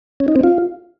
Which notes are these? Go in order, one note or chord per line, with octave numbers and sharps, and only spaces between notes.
C#4
D#4
C4
F4